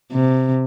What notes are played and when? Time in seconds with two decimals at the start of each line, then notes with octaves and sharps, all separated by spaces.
0.12 C3